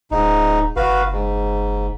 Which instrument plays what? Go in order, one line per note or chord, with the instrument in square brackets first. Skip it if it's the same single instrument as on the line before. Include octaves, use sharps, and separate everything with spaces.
[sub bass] D1 [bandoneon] G#2 D#4
[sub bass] F#1 [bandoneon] F#4 B4 F5
[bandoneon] G#2